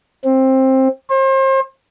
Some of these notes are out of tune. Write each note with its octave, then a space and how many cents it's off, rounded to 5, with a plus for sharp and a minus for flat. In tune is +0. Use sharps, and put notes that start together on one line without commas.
C4 +15
C5 +35